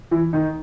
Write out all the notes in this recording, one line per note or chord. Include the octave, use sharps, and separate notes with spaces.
E3 E4
D#3 D#4